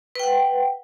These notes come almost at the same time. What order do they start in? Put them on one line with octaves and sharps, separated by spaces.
B4 G5 F#5